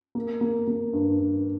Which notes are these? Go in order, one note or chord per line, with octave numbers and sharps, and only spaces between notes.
A#3
A#3
A#3
G2
G2